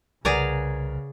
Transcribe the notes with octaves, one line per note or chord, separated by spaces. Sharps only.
C2 C#3 G#4 A#4 B4 D5 F#5 A#5